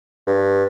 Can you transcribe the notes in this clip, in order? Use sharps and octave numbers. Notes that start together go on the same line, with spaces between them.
G2